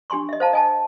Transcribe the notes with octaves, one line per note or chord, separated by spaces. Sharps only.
D4 G4 G#5 C6 C#6
D#5 E5
C5 F5 A5 A#5
D#5 G#5 A5